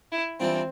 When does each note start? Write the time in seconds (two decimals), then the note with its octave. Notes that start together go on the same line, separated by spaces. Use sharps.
0.11 E4
0.40 E3 G3 C4 D4 F4